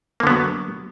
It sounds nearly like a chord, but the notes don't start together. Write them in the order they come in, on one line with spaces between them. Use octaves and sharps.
A#3 D3 B3 F#3